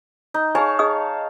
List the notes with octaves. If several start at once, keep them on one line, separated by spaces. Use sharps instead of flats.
D#4
G#4 C#5 F5 G#5 A5
G#4 D#5 D#6